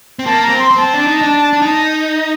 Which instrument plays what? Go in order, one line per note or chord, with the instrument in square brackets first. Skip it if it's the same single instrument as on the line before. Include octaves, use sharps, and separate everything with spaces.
[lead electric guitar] C4
[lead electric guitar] A#3 [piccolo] A5
[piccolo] A#5
[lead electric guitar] C4
[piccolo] C6
[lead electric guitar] C4
[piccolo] A5
[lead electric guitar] D4
D#4
D4
D4
D#4